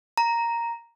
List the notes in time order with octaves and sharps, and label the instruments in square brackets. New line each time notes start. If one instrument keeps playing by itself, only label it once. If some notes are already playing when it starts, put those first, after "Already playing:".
[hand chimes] A#5